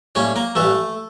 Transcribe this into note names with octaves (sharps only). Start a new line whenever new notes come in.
A2 G3 A#3 C#4 C#5
A#3 A#4
A1 G2 E3 A3 A4